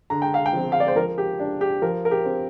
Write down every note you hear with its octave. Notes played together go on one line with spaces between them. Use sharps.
D3 A#5
G5
F5
G5
F3 C4
F5
D5
C5
F3 A#4
G4
D4
G4
F3 A#4
A#4
G4
C4